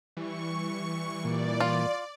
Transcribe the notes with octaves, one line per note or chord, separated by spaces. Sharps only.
E3 G3 C#6
A#2 D5
F4